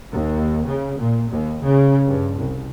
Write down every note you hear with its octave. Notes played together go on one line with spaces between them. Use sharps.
D#2
C#3
A#2
D#2
C#3
G2
C2